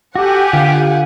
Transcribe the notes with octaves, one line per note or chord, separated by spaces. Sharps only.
F#4 G4 A4 F#5 G#5
D3 F4 F5